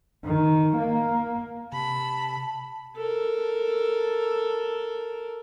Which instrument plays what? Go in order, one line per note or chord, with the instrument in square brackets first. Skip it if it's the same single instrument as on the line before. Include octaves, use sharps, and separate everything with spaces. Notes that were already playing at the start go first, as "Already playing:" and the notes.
[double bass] D#3
A#3
[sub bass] C3 [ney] A5 [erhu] B5
[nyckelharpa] A4 A#4